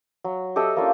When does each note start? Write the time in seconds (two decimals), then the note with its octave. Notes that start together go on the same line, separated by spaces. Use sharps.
0.24 F#3
0.56 G4 A4 D#5 E5
0.76 A#3 C#4 D4 F4